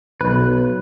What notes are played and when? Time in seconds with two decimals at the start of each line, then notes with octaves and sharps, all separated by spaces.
0.21 B1 B4